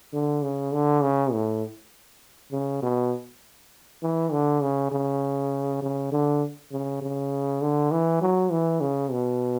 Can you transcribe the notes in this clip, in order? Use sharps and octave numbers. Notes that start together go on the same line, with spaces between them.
D3
C#3
D3
C#3
A2
C#3
B2
E3
D3
C#3
C#3
C#3
D3
C#3
C#3
D3
E3
F#3
E3
C#3
B2